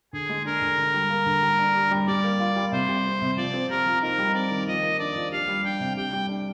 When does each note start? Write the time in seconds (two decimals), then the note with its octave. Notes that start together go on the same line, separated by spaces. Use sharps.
0.13 D3 G#4
0.30 G#3
0.45 D4 A#4
0.62 D3
0.78 D3
0.94 G3
1.10 A#3
1.26 D3
1.42 G3
1.59 D4
1.75 G4
1.91 G3
2.07 G3 D5
2.24 A#3
2.40 F4
2.56 G3
2.72 C3 C5
2.89 G3
3.05 C4
3.21 C3
3.37 F3 D5
3.54 C4
3.69 G4 A#4
3.86 F3
4.02 D#4 A#4
4.19 G3
4.34 C4 D5
4.51 D#3
4.67 F3 D#5
4.83 A#3
4.99 D4 D5
5.16 F3
5.32 G4 F5
5.48 G3
5.64 D4 G5
5.80 C3
5.97 G4 G5
6.13 G3
6.29 D4